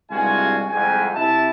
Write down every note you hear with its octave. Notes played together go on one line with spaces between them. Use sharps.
C2 G2 G#3 F4 F#4 G#5
C2 F2 G#2 G5 G#5
C3 E4 A5